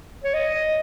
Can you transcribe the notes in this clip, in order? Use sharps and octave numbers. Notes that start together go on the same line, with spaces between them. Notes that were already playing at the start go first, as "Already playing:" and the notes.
C#5
D#5